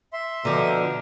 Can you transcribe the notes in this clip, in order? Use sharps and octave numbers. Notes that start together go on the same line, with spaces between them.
E5 C6
B2 D3 F3 A#4